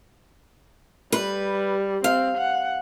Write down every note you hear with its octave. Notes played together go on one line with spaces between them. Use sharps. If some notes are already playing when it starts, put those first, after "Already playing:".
G3 B4
C4 F5
F#5